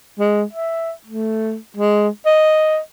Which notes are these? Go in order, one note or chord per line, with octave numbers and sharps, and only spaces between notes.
G#3
E5
A3
G#3
D#5